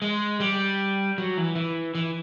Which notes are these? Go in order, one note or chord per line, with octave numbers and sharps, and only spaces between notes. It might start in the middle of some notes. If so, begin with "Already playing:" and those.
G#3
G3
F#3
E3
E3
E3